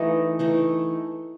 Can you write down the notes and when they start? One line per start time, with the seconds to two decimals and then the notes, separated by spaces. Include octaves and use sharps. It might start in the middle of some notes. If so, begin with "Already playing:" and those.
Already playing: E3 A3 D#4 D#5
0.39 E3 A3 D#4